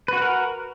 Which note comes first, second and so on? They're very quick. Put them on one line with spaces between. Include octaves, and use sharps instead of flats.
B4 F#4 F#5 A#4